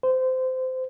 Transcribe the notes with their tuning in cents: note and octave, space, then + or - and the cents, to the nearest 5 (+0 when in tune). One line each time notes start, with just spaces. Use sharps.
C5 -20